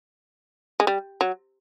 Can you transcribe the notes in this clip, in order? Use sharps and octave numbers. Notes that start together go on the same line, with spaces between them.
G#3
G3
F#3